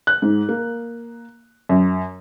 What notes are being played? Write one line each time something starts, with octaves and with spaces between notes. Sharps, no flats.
F#6
G#2
A#3
F#2